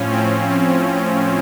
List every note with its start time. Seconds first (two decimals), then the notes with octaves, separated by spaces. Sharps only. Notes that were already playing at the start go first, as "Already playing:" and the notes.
Already playing: A2 F3 C#4
0.11 C4
0.49 C4